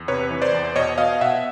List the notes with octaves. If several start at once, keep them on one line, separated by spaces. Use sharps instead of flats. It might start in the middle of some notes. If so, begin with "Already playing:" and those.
Already playing: E2
C3 B4 C#5
E3
C5 D5
E2
B2 C#5 D#5
B2 D#5 F5
B2 E5 F#5